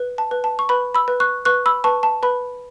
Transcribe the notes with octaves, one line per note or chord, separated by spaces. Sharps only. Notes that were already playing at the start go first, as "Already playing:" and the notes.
Already playing: B4
A5
B4
A5
C#6
B4 B5
B5 E6
B4
C#6 F#6
B4 C#6 F#6
B5 E6
B4 A5 C#6
A5
B4 B5